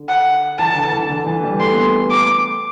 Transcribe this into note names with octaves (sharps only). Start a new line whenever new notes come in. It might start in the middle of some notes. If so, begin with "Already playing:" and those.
Already playing: D3
F#5
E3 A5
D3
E3
D3
E3
G3
A3 C6
B3
B3
A3
D6